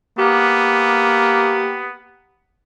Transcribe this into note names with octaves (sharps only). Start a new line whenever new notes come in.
A#3 B3 G4